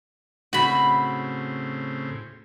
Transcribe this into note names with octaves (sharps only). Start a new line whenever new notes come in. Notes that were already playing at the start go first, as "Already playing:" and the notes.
A2 C#3 C4 F#4 B5